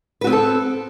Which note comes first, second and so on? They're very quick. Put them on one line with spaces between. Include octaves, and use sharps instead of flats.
B4 F#4 C4 B3 A4